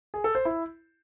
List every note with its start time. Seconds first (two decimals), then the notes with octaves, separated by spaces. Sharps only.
0.14 G#4
0.24 A4
0.35 C5
0.45 E4